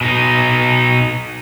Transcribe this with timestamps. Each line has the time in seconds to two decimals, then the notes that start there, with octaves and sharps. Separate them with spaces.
0.01 B2 D#4